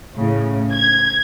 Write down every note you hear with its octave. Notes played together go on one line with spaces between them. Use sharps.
A2 C#3
G#6